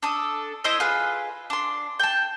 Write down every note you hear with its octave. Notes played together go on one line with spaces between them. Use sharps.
D4 A4 D#6
E4 C5 D#5 E5
F4 G#4 B4 B5
D4 C6
G5 A5